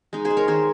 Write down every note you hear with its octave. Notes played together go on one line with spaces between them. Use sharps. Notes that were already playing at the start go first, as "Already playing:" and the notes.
G#3 D#4
G#4 C5
G#3
A#4 C#5
D#3 G#4 C5